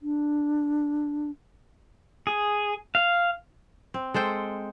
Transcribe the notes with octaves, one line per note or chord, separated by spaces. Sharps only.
D4
G#4
F5
C4
G#3 A4 C5 G5